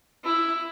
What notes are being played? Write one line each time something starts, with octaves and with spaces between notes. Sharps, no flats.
E4